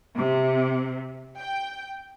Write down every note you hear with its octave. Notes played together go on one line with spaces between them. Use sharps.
C3
G5